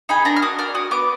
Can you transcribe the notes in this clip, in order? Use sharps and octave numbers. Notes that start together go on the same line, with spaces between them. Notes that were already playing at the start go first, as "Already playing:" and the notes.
D#4 G#4 B5
D4 A#5
F6
F#4 D#6
D4 F6
F#4 D#6
B3 D6